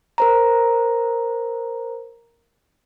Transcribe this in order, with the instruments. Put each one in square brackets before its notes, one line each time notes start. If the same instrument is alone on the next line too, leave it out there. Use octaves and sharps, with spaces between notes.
[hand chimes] A#4 C5 A#5